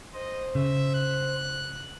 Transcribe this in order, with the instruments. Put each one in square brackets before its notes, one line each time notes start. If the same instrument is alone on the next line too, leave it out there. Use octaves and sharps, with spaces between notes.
[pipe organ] C5 [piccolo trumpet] D#5
[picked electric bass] C#3 [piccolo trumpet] E5
[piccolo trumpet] F#6